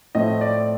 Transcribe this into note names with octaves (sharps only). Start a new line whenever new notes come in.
A2 F3 A3 C4 D#5
D5